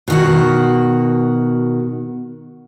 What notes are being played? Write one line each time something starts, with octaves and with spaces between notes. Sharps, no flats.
B2 D#3 F#4